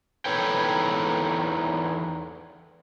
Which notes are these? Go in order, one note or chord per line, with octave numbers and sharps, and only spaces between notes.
E2 D#4 A4 B4 C#5 G5